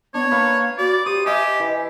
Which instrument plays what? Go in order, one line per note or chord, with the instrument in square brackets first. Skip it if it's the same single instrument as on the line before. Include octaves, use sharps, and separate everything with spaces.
[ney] B3 [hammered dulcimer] D4 [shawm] C#5
[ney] A#3 [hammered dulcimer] B4 F5 C#6
[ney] F#4 [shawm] D5
[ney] G4 [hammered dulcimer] C5 [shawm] D#6
[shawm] G4 [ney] D#5 [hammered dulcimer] E5 G#5
[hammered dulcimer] E3